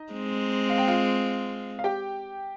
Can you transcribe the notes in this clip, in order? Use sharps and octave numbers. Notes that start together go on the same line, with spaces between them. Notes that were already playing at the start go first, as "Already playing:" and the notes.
Already playing: D#4 D#5
G#3 C4
F5
G5
F4 F5
F5
G4 G5